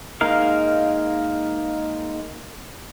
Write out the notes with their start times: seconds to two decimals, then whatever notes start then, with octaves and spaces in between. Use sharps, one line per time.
0.21 G#3 A#3 D#4 A#4 F5